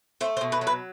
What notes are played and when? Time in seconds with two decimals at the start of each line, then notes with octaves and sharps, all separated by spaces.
0.21 A3 C5
0.37 C5
0.41 B2
0.52 B4
0.61 F#3
0.67 B4